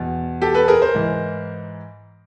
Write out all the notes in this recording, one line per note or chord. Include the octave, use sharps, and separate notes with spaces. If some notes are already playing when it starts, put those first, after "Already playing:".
Already playing: E2 B2
G4 A4
A4 B4
G#4 A#4
A#4 C5
G#2 E3